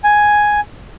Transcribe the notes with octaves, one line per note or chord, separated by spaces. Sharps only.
G#5